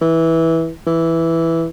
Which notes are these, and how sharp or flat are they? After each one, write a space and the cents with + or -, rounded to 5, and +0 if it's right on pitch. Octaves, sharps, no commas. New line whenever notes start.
E3 -10
E3 +0